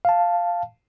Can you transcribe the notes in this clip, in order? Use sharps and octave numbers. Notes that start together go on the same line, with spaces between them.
F5 A5